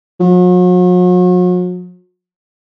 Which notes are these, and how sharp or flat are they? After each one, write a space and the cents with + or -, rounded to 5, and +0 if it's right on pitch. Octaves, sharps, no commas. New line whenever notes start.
F#3 -45